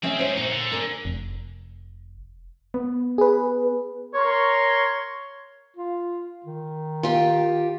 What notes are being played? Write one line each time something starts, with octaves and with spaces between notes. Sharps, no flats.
G#3 C4 C#4 E5
G#2 C5 C#5
A#2 D#4 F#4
D3
D4 G#4 A#4
F1
B3
G#4 B4
A#4 C#5 C6 C#6
F4
D#3
F4 G4